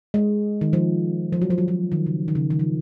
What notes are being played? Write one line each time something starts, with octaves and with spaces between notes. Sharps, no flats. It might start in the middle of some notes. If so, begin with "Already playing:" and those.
G#3
D#3
F3
F3
F#3
F3
F#3
F3
D#3
C#3
D#3
C#3
D#3
F3